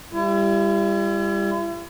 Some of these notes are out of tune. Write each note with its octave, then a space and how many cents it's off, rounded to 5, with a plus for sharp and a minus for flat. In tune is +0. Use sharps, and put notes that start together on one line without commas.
G3 +20 E4 +45